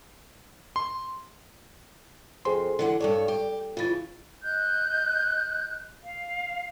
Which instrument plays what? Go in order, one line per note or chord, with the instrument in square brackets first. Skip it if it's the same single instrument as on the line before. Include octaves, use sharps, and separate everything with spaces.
[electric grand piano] C6
[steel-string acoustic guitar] F2 [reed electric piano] G#4 C5 C6
[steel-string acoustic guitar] D3 E3 F#5
[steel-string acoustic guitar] G2 A4 C#5 [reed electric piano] D5
[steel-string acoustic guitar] G4
[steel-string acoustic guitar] C#3 E3 [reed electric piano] F4 A6
[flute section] D#5 F#6 G6
F5